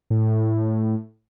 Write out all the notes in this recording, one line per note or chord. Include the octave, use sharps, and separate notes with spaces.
A2